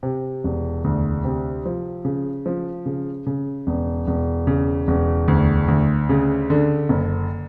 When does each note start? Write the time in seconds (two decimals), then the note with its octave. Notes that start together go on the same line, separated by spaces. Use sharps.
0.03 C3
0.44 E1
0.84 D2
1.24 C3
1.65 F3
2.05 C#3
2.46 F3
2.86 C#3
3.26 C#3
3.67 E1
4.07 E1
4.47 C#3
4.88 E1
5.28 D2
5.68 D2
6.09 C#3
6.50 D3
6.89 F#1